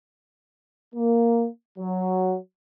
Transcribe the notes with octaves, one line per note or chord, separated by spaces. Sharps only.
A#3
F#3